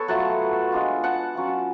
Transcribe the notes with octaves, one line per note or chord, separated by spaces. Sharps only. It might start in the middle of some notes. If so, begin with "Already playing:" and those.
Already playing: B3 A4 B4 C#5
F#3 A3 F4 F#5 A5
G#3 D4 F4
F#5 A5
F#3 C#4 F4